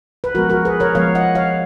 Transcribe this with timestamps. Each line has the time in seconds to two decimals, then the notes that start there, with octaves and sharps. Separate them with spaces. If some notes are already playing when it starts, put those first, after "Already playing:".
0.24 B4
0.35 F3 G#3 B3 F#4 A#4
0.50 F#4 A#4
0.65 G#4 B4
0.80 A#4 C#5
0.95 F3 G#3 B3 C#5 F5
1.15 D#5 F#5
1.35 C#5 F5